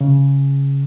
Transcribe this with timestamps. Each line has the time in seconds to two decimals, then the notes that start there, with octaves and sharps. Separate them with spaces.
0.01 C#3